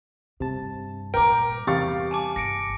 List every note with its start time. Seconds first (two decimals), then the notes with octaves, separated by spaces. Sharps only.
0.40 G2 C3 A5
1.14 G2 A#2 A#4 G5 D6 D7
1.67 E2 C3 G3 G4 F5 C#6 A6
2.11 G#5 A5 D6
2.36 G1 A#6 C#7 D7